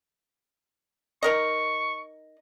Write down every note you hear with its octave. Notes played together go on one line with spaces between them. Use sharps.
D#4 A#4 D#5 C#6